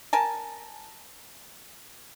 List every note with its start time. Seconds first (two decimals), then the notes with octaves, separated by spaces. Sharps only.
0.13 A#4 G#5 A5